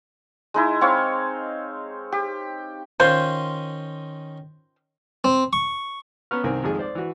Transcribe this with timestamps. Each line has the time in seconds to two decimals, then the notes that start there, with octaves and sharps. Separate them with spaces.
0.54 G#3 D#4 E4
0.81 C4 C#5 F5
2.12 G4
3.00 D#3 C#4 F4 C5 C6
5.24 C4
5.53 C#6
6.31 B3 C#4 B4 A#5 C#6 F6
6.44 C2 D#3 C4 A#4 G#5
6.64 G#1 F2 G#3 G#4
6.79 C5 D5
6.95 E3 F#4